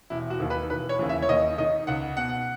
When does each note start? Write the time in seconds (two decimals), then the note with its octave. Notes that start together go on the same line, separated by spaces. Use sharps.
0.10 E1 E4
0.30 F#4
0.40 D#2 D#3
0.50 B4
0.70 E1 B4
0.89 C#5
0.99 D#2 C#3 E3
1.09 E5
1.22 C#5
1.29 D#2 D#5
1.58 D#3 D#5
1.87 C#2 F#5
2.17 B2 F#5